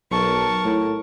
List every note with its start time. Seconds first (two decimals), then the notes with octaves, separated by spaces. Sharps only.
0.11 B1 A#4 A5 C#6
0.65 A2